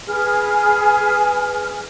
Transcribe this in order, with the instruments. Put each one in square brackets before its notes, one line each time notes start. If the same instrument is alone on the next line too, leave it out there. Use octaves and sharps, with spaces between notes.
[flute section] G#4 B4 G#5 F6